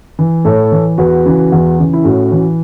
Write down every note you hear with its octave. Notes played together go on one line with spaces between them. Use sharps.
E3
A2 A4 C#5
E3
E2 F#4 B4
C#3 E3
E2
C#3 E3
E4
A2 C#4 F#4
E3